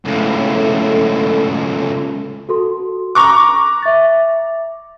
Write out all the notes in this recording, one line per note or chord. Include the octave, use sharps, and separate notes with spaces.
C#2 A2 A4
F#4 A4 C6
A#5 C#6 D6 F#6
E5 A6